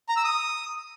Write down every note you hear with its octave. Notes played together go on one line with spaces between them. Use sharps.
A#5
E6
D#6